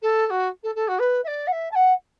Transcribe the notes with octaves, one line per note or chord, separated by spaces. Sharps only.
A4
A4
F#4
A4
A4
F#4
B4
E5
D5
F#5
E5
A5
F#5